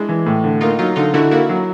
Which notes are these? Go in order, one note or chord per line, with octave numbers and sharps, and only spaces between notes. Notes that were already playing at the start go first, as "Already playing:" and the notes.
Already playing: G#3 D4 E4
E3
A2
D3
A#3 D#4 F4
F#3 D#4 F4
D3 D#4 F4
D3 E4 F#4
A#3 E4 F#4
F#3